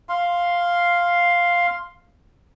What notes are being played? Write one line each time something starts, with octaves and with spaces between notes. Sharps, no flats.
F5 C6